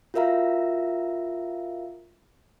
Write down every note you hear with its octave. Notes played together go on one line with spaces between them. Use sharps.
F4 F#4 A#4 E5 F5 A#5